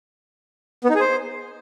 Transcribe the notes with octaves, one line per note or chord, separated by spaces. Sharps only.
B3
D#4
G#4
C5